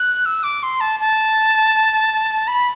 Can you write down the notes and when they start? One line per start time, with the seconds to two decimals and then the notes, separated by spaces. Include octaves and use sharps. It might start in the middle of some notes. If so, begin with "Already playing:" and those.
Already playing: F#6
0.26 E6
0.43 D6
0.63 C6
0.80 A5
1.00 A5
2.48 B5